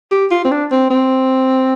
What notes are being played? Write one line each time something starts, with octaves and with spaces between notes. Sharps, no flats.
G4
F4
C4
D4
C4
C4